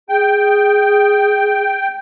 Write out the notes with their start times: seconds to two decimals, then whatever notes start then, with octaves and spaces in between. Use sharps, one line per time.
0.09 G#4 G5